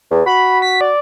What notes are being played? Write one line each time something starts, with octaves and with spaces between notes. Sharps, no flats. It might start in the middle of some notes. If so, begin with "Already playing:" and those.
E2
F#4 B5
B6
D5